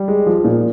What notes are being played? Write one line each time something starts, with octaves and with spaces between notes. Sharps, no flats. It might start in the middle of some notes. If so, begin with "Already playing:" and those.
Already playing: G3
G#3
F3
A#2